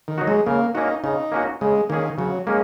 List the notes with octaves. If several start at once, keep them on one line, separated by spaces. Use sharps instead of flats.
D#3
F#3 D#4 F#4
G#3
C#3 A#3
A#3 C#4 D#4 F#4
C#3 D#4
A#3 C#4 F#4
C#3 G#3
D#3 A#3 C#4 G#4
C#3 F#3
G#3 A#3 C#4